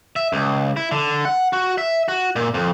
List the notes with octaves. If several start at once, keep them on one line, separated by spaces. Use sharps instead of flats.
E5
C#2
E4
D3
F#5
F#4
E5
F#4
A#2
F2